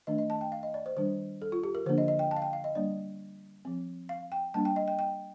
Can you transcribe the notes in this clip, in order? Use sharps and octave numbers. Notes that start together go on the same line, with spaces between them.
D#3 A3 D4 D#5
D#5
A5
G5
F5
D#5
D5
C5
D#3 G3 D4 C5
A4
F4
G4
A#4
D3 F3 A#3 D4 C5
D#5
D#5
G5
A5
F5
G5
F5
D#5
G3 A#3 D4 D5
F3 C4
F5
G5
G3 A#3 D4 A5
G5
D#5
G5
G5